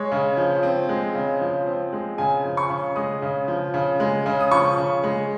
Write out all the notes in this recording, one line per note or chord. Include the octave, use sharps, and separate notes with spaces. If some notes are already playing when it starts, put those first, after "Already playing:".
Already playing: G#3 C#5
C#3
F3
C4
G#3
C#3
F3
C4
G#3
C#3 G#5
F3
C#6
C#3
G#3 D#6
C#3
F3
C#3
G#3
C#3
D#6
F3 C#6
C#3
G#3